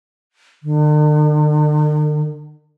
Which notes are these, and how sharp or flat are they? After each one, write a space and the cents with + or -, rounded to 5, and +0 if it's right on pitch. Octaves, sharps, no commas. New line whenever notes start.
D3 +45